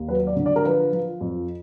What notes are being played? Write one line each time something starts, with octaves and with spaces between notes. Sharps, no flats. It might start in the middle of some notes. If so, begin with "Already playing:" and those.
Already playing: D#2
F#3 B4
D5
D3
D5
A#4
F3 B4
F3
F2